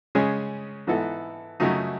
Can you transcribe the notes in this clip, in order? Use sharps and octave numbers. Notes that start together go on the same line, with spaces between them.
C#3 G#3 C#4 G#4
G#2 E3 B3 E4 A4
F#2 C#3 F#3 A3 D#4